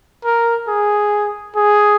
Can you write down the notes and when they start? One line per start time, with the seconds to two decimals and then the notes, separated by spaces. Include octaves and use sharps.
0.24 A#4
0.68 G#4
1.56 G#4